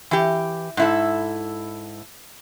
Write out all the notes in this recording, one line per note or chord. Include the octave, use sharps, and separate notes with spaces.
E3 G4
G#2 E4 A4